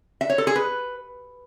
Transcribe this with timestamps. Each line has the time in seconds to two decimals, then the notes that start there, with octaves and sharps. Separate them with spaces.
0.21 E5
0.30 C#5
0.38 A4
0.47 G#4
0.56 B4